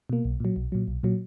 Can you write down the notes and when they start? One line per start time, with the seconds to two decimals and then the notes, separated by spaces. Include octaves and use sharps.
0.10 B2 A#3
0.25 B1
0.40 A#2 F#3
0.56 B1
0.72 A#2 F#3
0.88 B1
1.03 A#2 F#3